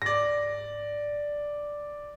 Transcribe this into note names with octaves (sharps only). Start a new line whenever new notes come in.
G#2 D5 A#6